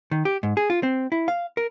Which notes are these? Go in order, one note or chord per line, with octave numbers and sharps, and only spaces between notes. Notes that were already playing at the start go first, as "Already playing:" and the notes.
D#3
G4
G#2
G#4
F4
C4
E4
F5
A#4